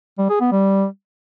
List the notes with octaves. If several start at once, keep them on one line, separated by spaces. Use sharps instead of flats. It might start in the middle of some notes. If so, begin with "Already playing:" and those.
G3
G#4
B3
G3